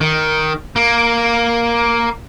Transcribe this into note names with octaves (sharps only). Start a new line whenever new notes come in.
D#3
A#3